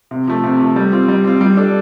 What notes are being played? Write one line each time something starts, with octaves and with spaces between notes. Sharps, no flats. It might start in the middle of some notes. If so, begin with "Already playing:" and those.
C3
F3 A3
C3
F3 A3
G3
C4 F4
G3
C4 F4
G3
D4 A4